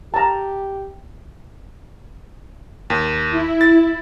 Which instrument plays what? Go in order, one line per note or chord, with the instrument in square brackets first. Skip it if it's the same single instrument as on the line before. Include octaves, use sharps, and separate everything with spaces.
[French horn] G4 [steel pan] A5 A#5
[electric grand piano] D#2
[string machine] E4
[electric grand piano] A6